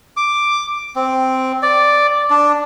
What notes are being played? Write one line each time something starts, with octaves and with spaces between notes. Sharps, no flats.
D6
C4
D5
D4